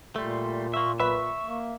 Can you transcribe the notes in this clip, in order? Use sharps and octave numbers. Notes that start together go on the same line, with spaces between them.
A#2 G3 A3 C6
A#3 E5 C6 C#6
B1 B4 E5 C#6 B6
A#3